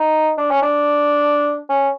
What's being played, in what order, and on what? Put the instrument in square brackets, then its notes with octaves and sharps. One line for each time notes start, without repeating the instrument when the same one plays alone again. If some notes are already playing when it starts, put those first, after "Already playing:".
Already playing: [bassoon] D#4
D4
C#4
D4
C#4